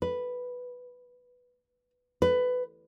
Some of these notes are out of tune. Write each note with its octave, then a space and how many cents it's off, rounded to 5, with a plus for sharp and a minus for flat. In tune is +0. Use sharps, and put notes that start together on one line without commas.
B4 +0
B4 +15